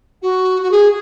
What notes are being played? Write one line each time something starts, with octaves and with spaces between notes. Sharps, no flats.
F#4
F#4
G#4